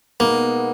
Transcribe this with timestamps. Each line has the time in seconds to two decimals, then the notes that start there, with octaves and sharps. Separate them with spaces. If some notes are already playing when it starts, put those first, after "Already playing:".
0.20 B2 G#3 A#3 B3 D#4